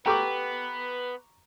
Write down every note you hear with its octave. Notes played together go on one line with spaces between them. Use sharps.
B3 G4 A4 B4 G5 A#5 C#6 D6